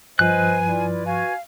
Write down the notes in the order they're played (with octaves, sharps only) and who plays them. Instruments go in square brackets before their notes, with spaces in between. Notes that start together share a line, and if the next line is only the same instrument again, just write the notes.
[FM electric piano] G2 F3 [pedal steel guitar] B4 F#6 [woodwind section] C5 D#5 [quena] G#5
[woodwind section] E4 F4 D5
[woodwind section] F#4 G#5 [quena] F5